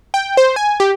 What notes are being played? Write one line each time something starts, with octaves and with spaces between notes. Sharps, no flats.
G5
C5
G#5
G4